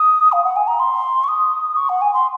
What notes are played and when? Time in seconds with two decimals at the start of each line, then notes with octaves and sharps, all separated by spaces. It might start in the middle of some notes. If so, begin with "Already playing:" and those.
Already playing: D#6
0.32 F5
0.44 F#5
0.56 G#5
0.68 A#5
0.80 C6
1.24 C#6
1.28 D#6
1.76 C#6
1.89 F#5
2.02 G#5
2.14 C6